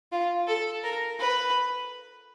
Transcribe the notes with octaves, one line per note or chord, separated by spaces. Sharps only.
F4
A4
A#4
B4